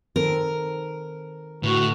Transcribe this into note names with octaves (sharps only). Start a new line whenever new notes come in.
D#3 C4 A4 A#4
A2 D3 F#4 B4